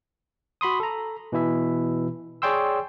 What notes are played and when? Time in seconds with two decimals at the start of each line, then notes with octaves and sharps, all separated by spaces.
0.61 F#4 B5 C6 D#6
0.80 A4 A#5
1.32 B2 E3 E4 E5
2.42 G#4 C#5 D5 G5 C6 E6